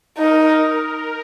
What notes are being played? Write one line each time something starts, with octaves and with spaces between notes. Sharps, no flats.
D#4 A#4